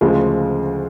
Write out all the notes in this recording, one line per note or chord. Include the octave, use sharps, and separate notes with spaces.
D2 C#3 F3 G#3